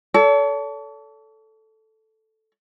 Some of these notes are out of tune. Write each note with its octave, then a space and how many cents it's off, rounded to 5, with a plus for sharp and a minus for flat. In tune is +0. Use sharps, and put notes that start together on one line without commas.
A4 +0 C#5 +45